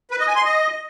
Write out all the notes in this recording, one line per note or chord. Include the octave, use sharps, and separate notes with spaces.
B4
D#5
G#5
C6
D#5